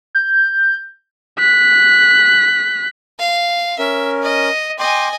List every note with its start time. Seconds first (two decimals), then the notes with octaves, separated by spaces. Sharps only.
0.15 G6
1.39 F#6 B6
3.19 F5
3.79 C#4 A#4 E5
4.23 D#5
4.79 D#5 G5 G#5 C6 D6